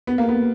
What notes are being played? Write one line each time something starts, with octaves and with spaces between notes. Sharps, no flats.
B3
A#3
B3